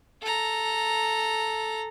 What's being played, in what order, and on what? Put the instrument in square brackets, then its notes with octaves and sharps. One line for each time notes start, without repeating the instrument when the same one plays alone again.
[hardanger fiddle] A4 A#5